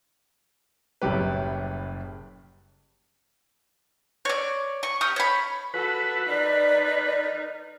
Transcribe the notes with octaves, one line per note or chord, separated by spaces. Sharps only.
F#1 A2 F#3 G3 G4 B4
C#5 D5
C#6
C#4 G4 D#6
C#5 B5
F#4 A4 B4
D#4 A#4 D5